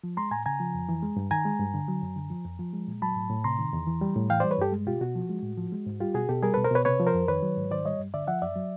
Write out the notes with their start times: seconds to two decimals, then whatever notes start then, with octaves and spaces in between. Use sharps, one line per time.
0.04 F3
0.17 G#3 A#5 C6
0.31 A2 G#5 A#5
0.46 C#3 G#5 A#5
0.60 F3
0.74 F2
0.89 E3
1.03 G#3
1.17 G2
1.31 D#3 G#5 A#5
1.45 G#3
1.60 G2
1.74 D3
1.88 F#3
2.02 F#2
2.16 D3
2.30 F3
2.45 F2
2.59 F3
2.73 G#3
2.88 A#2
3.02 F#3 A5 B5
3.16 A2
3.30 A2
3.44 C3 A#5 C6
3.59 D#3
3.73 E2
3.87 E3
4.01 G3
4.16 A2
4.30 E3 F5 G5
4.40 G3 C5 D5
4.51 B4 C#5
4.58 G2 G4 A4
4.72 G#3
4.87 B2 F4 G4
5.01 B2 F#4
5.15 F3
5.29 G#3
5.43 A2
5.58 F3
5.72 G#3
5.86 G#2
6.00 G3 F4 G4
6.14 B2 F#4 G#4
6.29 B2 G4 A4
6.43 G3 G#4 A#4
6.54 B2 A4 B4
6.65 A#4 C5
6.71 B2 B4 C#5
6.85 C3 B4 C#5
7.00 F3
7.07 A#4 C5
7.14 F2
7.28 D#3 B4 C#5
7.43 F#3
7.57 G#2
7.71 D#3 C5 D5
7.85 G3 C#5 D#5
7.99 G2
8.14 D3 D5 E5
8.27 F3 E5 F#5
8.42 F#2 D5 E5
8.56 F#3